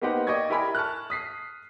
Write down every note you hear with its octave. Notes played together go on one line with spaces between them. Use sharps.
A#3 B3 D#4 G4 C5 F#5
D5 D#5 G5 C#6 G#6 A6
E4 G4 A#4 G#5 B5
A5 C#6 F6 F#6
D#6 B6 C7